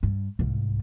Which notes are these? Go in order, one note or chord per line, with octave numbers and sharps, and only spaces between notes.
G2
C2 G#2